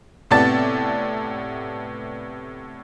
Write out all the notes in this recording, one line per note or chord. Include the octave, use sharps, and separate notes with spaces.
A2 C3 B3 D5 A5 A6